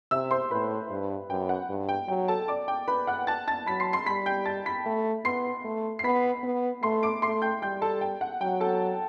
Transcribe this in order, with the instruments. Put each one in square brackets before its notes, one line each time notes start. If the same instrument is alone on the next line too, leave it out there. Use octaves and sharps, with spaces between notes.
[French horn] C3 [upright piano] E5 E6
[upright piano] C5 C6
[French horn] A2 [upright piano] B4 B5
[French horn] G2
[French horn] F#2 [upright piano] G5
[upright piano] F#5
[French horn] G2
[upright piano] G5
[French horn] F#3 [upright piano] G5
[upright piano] A4 A5
D5 D6
G5
B4 B5
F#5 F#6
A5 A6
A5 A6
[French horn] F#3 [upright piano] B5 B6
[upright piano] C6 C7
C6 C7
[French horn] G3 [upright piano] B5 B6
[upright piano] G5 G6
A5 A6
B5 B6
[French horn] A3
[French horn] B3 [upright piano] C6 C7
[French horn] A3
[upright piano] C7
[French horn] B3 [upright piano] B5 B6
[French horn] B3
[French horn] A3 [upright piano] C6 C7
[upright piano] D6 D7
[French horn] A3 [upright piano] C6 C7
[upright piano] G5 G6
[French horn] G3 [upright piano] G5 G6
[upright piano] A4 A5
G5
F#5
[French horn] F#3 [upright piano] G5
[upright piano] A4 A5